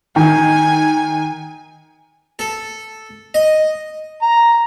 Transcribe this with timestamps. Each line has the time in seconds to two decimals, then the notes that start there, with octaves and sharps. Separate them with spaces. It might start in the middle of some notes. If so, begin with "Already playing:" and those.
0.16 D#3 G#5
2.39 A4
3.34 D#5
4.22 A#5